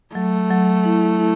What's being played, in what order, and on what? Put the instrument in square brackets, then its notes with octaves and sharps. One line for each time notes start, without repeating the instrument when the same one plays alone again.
[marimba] F#3 [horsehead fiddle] A3
[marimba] F#3
E4
E4